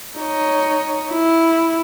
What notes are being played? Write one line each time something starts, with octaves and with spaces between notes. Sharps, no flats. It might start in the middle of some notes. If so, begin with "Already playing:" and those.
D#4 C#5
E4